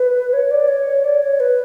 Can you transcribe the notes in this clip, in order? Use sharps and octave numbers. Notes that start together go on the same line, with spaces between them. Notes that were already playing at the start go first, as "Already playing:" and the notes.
Already playing: B4
C#5
D5
C#5
D5
C#5
B4